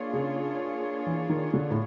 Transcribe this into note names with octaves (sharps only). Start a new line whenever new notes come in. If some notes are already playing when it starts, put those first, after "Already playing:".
Already playing: A#3 D4 F4 G#4 C#5
C#3
E3
D#3
D3
A2